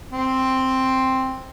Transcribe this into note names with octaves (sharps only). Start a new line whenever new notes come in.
C4